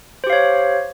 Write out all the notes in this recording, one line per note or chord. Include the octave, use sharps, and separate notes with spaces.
G4 C5 C#5 F5